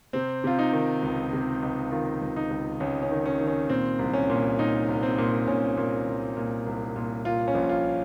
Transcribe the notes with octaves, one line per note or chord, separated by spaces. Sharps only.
C3 C4
C3 F4
D#4
D#3
C#2
C3
C#2
D#3 F4
C#2
D#4
C#2
C#2 C#4
C#4
D#3
C#4
D#3
C#4
A#2 C4
C2
C#4
A#2
A#2 D#4
C2
C4
A#2
A#2 C#4
A#2
C2
A#2
C2
A#2
A#2 F4
C#4
A#1
F4